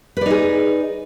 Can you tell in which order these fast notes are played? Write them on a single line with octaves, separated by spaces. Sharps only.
B4 D5 D#4 G#4